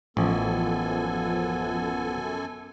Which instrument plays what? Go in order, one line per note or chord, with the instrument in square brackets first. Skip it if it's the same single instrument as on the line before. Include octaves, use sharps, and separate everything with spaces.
[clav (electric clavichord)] A1 [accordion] F#2 A4 G#5 [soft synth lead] F3 [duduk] B3